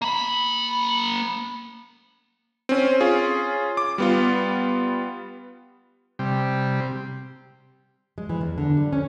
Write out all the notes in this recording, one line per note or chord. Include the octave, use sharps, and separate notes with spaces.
A#3 B5
C4 C#4
C#4 F4 G#4
D6
G3 B3 F4
C3 G3
G#3
E3
E2
D3
G3
C#4